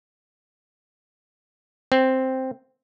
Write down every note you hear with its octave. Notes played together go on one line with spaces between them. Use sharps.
C4